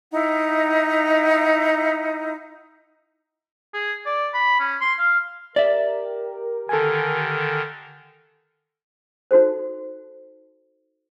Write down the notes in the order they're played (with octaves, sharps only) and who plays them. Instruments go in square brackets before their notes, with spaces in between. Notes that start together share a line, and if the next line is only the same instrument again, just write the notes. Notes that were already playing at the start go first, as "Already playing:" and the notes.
[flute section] D#4 E4 F#5
[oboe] G#4
D5
B5
C#4
C6
F5
[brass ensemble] G4 A#4 [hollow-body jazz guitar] D5 E5
[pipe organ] D3 D#3 [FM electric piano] A4 G#5
[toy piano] D#4 F#4 A4 C5